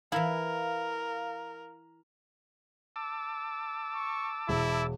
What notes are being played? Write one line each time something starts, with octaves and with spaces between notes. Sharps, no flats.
E3 E4 A#4 F5
A5 D6 E6
C#6
E1 E4